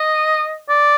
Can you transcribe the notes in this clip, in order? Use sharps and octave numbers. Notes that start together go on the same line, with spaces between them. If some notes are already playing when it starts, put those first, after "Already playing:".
Already playing: D#5
D5